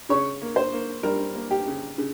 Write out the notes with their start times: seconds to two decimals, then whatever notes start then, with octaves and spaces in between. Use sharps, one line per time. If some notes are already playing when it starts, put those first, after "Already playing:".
0.09 C#3 C#5
0.41 A#3
0.56 C5
0.73 A#3
1.03 G3 A#4
1.35 A#3
1.51 G4
1.67 C#3
1.98 C#3